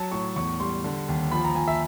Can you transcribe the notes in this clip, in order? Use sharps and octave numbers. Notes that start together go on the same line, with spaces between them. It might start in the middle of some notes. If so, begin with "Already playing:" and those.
Already playing: F#3 A5
A2 C#6
E2 C#6
G3 C6
D3
D#2
F3 B5
A#5
F3 G#5
E5